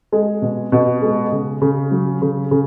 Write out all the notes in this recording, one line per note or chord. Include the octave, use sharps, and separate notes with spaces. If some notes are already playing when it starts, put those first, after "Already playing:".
G#3
B2
B2
G#3
C#3
C#3
F#3
C#3
C#3